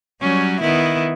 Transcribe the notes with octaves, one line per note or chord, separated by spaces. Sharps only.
F#3 G3 C#4
D#3 B3 E4